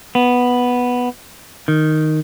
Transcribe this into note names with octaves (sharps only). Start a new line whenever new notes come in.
B3
D#3